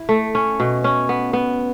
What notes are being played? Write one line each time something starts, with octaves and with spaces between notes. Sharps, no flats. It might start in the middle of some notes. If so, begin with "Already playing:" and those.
Already playing: E4
A3
C#4
B2
C#4
B3
B3